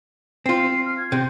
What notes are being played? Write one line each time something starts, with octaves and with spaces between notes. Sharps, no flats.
C4 F4 C7
F6
G#6
C3 G6